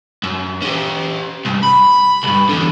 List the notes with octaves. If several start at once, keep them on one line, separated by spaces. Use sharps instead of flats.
F#2
C#4 G4
C2 G2
B5
C2 G2
E2 D3